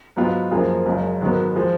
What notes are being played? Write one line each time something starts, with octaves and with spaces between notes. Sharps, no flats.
G#2 F#3 B3 F4
F#2 F3 A#3 F4 G#4
F#1 F#2 C#3 G#3
G#2 D#3 F#3 B3
F3 G#3 D#4